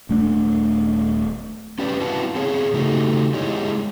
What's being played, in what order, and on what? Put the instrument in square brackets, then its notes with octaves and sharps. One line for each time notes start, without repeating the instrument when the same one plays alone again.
[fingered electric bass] D#1 A3 B3 D4
[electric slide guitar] C#4 G4 B4 D5
C4 E4 F#4 B4 F5 A5
C4 G#4 C#5
C#3 A3 D#4 F#4 G4 A4
G#3 E4 G4 C#5 D#5